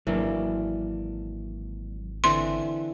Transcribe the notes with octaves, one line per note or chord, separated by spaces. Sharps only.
G#1 E3 F#3 A#3 D4
D3 E3 C4 C6